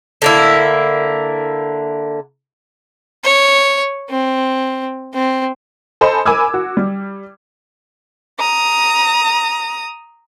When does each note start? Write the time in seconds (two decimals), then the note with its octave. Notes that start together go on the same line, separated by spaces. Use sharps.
0.22 D3 A#3 E4
3.24 C#5
4.10 C4
5.13 C4
6.01 A4 C5 D#5 G#5 B5
6.26 A#4 G#5 B5 D6 E6 G#6
6.54 F#4
6.77 G3
8.39 A#5 D#6